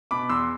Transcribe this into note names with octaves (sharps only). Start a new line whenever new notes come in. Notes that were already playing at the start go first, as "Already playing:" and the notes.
B2 B5 D6
E2 C6 E6